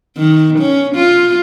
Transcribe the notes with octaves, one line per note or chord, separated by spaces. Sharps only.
D#3
C#4
F4